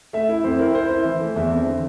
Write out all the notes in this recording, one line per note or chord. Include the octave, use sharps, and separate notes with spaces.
A3 E5
E4
F2 C5
E4 A#4
E4 C5
E4
E3
A3
E2 E5
C4
D3